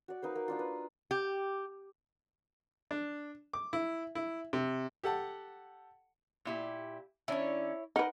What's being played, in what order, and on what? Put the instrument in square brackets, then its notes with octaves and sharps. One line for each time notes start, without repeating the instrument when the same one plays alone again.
[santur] F#4 D5
A#3 D#4 B4 C5
A#3
A#3 D4 F4
B4
[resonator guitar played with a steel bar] G4
[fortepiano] D4
D6
E4
E4
C3
G4 A4 F#5 A5
[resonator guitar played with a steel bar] A#2 E4 G4
[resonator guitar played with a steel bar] D#3 C#4 D4 [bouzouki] E4 C#5
[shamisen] D#4 B4 [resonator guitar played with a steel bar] A#4 D#5 F#5